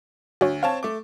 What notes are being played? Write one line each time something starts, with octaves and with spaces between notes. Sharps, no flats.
D2 F#4 C#5
C4 C#5 F5 A5
A3 D6